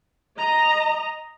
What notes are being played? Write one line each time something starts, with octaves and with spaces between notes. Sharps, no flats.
D#5 A#5